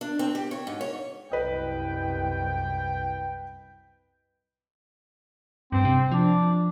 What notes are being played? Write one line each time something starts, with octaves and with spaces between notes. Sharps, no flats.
D4
C4
G4
C#5
G#2
C#5
C2 F#2 B4 D#5 G5
G2 C4
C3
F3 D4